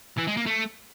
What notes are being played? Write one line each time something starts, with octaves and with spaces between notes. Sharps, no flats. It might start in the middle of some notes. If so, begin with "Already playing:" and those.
E3
G#3
A#3
A3